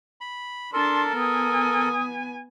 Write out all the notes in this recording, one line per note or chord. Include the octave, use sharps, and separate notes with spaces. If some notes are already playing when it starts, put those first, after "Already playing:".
B5
D4 A4 A#4 A5 C6
B3 G#5 D#6